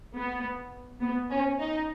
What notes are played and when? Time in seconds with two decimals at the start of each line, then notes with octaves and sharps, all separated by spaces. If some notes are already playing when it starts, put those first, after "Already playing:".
0.15 B3
1.01 B3
1.30 C#4
1.59 D#4